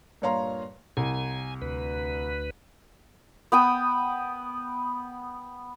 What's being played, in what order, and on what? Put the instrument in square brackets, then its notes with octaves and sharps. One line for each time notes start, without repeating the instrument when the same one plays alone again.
[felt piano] G2 A#2 C#5 F5 A#5 C6
[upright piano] C2 [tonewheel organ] G#5
[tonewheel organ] D2 B4
[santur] B3 G5 D#6